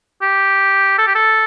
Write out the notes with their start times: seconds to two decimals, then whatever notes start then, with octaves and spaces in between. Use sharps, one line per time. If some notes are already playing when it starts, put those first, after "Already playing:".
0.22 G4
0.98 A4
1.07 G4
1.15 A4